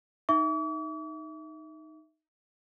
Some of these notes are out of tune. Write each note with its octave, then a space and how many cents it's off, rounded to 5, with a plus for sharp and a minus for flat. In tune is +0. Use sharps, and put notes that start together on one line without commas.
D#4 +0 E5 +0 D6 -45